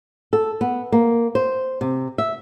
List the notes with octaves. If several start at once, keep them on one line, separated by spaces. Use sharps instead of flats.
A4
B3
A#3
C5
C3
E5